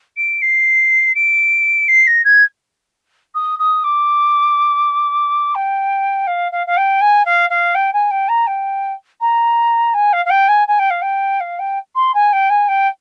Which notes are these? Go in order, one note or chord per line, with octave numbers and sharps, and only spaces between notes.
D7
C7
D7
C7
A#6
G#6
D#6
D#6
D6
G5
F5
F5
F5
G5
G#5
F5
F5
G5
G#5
G5
A#5
G5
A#5
G#5
F5
F5
G5
G#5
G#5
G5
F5
G5
F5
G5
C6
G#5
G5
G#5
G5